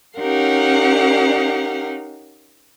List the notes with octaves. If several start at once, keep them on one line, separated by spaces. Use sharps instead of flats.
C#4 D#4 G4 A#4 F5 F#5